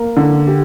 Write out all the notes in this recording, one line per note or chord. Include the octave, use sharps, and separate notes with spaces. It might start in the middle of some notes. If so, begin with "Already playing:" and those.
Already playing: A#3
D3
G4